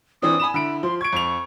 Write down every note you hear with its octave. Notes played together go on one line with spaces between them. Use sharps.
E3 C4 D4 D#6
G#5 B5 E7
D3 E4 B5 D7
F3 C6
C#6 G#6 D7
F2 F7